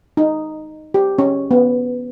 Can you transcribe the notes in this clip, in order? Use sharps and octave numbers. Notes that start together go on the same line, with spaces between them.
D#4
G4
C#4
B3